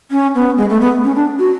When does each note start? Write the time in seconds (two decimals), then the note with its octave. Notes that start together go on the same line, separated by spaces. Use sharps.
0.11 C#4
0.35 B3
0.57 G#3
0.70 A3
0.81 B3
1.04 C#4
1.15 D4
1.39 F#4